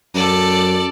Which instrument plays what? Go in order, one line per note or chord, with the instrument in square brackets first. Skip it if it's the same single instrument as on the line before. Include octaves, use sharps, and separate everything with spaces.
[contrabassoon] F#2 [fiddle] A4 D5